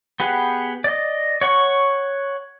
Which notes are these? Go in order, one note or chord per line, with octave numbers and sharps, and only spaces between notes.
B3 G4 G#4 F#5
D5 D#5
C#5 F#5 C#6